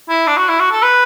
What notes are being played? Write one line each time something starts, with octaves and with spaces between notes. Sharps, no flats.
E4
D4
F#4
E4
F#4
A4
B4